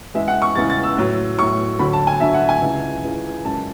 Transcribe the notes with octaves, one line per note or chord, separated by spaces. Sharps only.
E2 C#3 E3 G#3 E5
F#5
C#6
E2 C#3 E3 G#3 A6
A6
E6
A2 F#3
A2 F#3 C#6
D2 D3 F#3 B5
A5
G#5
D2 D3 F#3 E5
F#5
G#5
C#2 C#3 E3
C#2 C#3 E3
F#2 C#3 G#3 A5